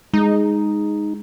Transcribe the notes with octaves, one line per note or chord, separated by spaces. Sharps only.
G#3 D#4